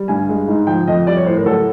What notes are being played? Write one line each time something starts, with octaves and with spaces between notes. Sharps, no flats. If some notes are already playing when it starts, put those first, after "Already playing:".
Already playing: G3
G2 G#5
G#3
G#2
F3 G5
F2 D#5
G3 D5
C#5
A2 C5
A#4
F#3 A4